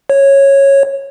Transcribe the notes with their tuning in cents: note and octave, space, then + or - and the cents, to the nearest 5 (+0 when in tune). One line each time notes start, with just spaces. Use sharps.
C#5 -10